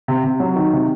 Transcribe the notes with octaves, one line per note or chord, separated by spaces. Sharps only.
C3
C3
F#3
D#3
C3